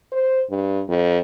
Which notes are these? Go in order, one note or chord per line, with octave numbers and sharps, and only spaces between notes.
C5
G2
F2